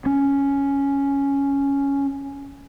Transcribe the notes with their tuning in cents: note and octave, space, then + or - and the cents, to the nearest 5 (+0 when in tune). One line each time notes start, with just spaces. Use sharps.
C#4 +5